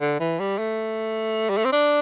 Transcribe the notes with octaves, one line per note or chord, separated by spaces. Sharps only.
D3
E3
G3
A3
G3
A3
C4
D4